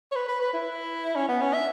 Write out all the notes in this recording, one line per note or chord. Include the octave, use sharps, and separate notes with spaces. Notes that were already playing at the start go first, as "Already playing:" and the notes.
C#5
B4
B4
B4
E4
C#4
B3
C#4
E5